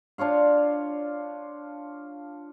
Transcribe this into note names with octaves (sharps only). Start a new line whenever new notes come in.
D4 F4 C#5 F5